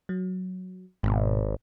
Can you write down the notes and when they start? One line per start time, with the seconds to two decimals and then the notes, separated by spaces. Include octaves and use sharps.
0.09 F#3
1.03 G#1 G#2 B2